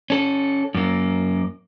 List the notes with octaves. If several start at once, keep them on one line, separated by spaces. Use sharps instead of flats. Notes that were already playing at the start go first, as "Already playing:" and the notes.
C#4 A4
F#2 A#3